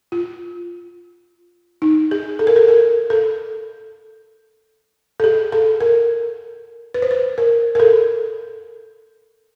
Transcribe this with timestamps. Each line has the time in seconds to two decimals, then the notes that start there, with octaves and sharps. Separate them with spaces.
0.12 F4
1.82 D#4
2.11 G#4
2.39 A4
2.47 A#4
2.56 A4
2.68 A#4
3.10 A4
5.20 A4
5.24 G#4
5.52 A4
5.81 A#4
6.94 B4
7.02 C5
7.11 B4
7.38 A#4
7.75 A#4
7.80 A4